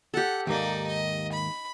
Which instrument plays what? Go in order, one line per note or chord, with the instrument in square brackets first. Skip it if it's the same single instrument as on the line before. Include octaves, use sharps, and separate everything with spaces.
[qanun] G4 A4 [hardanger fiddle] F#5
[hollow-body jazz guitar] D#2 G#2 A#3 [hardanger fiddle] D#4 D5
[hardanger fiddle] D#5
B5